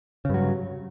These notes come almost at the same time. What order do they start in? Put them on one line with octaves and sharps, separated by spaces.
C#3 G2 F#3